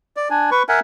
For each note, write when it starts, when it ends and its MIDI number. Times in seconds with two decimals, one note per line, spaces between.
0.17 0.28 74
0.30 0.50 62
0.30 0.50 80
0.51 0.63 71
0.51 0.63 85
0.69 0.80 70
0.69 0.80 76
0.69 0.80 78
0.69 0.80 80